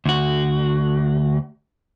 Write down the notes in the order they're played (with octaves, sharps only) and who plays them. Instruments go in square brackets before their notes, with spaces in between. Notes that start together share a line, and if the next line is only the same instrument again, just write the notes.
[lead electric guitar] D2 F#4